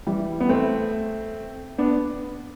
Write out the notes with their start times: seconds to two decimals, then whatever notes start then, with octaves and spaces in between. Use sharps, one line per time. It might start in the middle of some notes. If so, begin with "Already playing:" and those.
0.07 E3 G3
0.40 B3
0.49 A3 C4
1.78 B3 D4